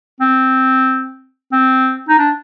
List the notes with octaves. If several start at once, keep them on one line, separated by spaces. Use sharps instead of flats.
C4
C4
D#4
D4